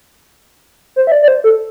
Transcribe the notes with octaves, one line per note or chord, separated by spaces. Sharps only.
C5
E5
D5
D5
C5
A4